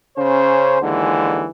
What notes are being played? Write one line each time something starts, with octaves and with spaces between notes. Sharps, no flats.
C#3 C#4 C5
D#2 D3 E3 G#3